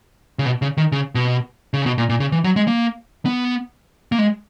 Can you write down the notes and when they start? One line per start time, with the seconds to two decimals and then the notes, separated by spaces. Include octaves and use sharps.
0.39 C#3
0.45 B2
0.62 C#3
0.77 D#3
0.92 C#3
1.15 B2
1.74 C#3
1.86 B2
1.98 A#2
2.09 A#2
2.20 C#3
2.32 E3
2.44 F#3
2.56 G#3
2.67 A#3
3.25 B3
4.12 A#3
4.19 G#3